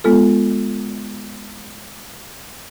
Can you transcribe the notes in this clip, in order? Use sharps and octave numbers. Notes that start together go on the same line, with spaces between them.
G#3 B3 F4 A4